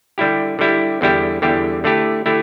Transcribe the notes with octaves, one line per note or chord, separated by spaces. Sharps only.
D3 G3 E4 G4
D3 G3 E4 G4
E2 D3 G3 E4 G4
E2 D3 G3 E4 G4
D3 A3 E4 G4
D3 A3 E4 G4